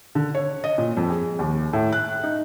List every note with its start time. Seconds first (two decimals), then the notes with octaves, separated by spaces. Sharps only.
0.15 D3
0.35 C#5
0.64 D#5
0.78 A#2
0.97 F2
1.10 G#4
1.39 D#2
1.73 A2
1.92 F#6
2.24 D#4